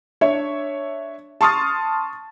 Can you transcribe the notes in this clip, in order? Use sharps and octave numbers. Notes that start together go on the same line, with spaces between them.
D4 C#5 E5
A5 C6 C#6 D#6 F6 A6